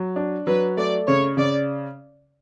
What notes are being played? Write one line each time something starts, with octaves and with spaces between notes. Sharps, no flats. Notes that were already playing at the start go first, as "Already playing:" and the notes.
Already playing: F#3
D4
F#3 B4
A3 D5
C#3 C#5
C#3 D5